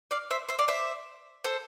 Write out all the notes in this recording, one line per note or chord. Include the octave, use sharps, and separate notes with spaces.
D5 F5
C5 E5
C5 E5
D5 F5
C5 E5
A4 C5